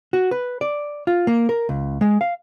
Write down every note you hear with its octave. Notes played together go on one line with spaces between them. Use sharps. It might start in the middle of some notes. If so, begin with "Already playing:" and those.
F#4
B4
D5
F4
A#3
A#4
C#2
G#3
F5